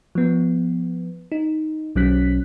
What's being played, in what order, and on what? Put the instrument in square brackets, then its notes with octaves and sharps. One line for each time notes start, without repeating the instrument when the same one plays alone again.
[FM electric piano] F3 B3
D#4
B1 F#3 C#4 F#6 B6